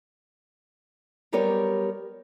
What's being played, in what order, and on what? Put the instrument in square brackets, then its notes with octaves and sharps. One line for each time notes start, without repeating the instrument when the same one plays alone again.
[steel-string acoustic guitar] F#3 G3 B3 G4 A#4 C#5